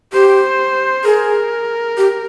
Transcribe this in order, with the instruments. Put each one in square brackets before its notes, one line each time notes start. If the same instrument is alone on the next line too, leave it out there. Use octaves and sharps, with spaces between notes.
[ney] G4 [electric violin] C5
[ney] G#4 [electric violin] A#4
[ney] G4